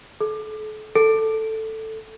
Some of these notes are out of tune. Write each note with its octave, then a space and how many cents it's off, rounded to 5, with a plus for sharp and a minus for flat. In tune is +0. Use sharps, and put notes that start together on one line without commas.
A4 -35
A4 +5